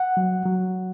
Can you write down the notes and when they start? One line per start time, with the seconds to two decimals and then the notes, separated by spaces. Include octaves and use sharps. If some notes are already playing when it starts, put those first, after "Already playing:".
Already playing: F#5
0.17 F#3
0.46 F#3